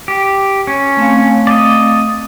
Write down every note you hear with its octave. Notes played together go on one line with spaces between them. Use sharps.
G4
C#4
A3 C4 F5
D5 D#5